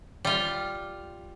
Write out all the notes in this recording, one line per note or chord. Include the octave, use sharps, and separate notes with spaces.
G3 F4